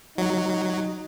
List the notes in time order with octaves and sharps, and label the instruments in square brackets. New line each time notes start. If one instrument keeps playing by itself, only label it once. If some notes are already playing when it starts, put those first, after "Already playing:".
[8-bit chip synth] F#3 [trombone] D#4